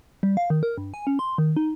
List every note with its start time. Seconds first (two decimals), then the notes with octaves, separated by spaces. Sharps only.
0.23 G3
0.37 F5
0.50 D#3
0.63 A#4
0.78 G2
0.94 G#5
1.07 C#4
1.19 C6
1.38 D#3
1.57 D#4